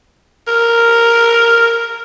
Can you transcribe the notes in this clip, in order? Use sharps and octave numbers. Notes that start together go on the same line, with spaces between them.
A#4